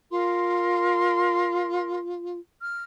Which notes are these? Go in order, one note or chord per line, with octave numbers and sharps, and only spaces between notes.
F4 A#4 C6
F6